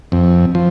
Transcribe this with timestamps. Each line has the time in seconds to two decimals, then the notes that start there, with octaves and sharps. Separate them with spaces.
0.12 F2
0.55 F3